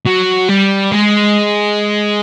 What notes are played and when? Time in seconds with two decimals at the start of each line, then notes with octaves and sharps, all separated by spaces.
0.06 F#3
0.48 G3
0.92 G#3